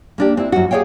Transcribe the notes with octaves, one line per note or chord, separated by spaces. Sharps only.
A#3 D4 G4
C4 E4
F#2 F#4
G4 G#4 C5 C#5 F5 G5